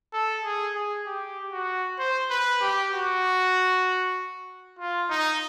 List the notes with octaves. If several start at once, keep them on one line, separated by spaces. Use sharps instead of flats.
A4
G#4
G#4
G4
F#4
C5
B4
G4
F#4
F4
D#4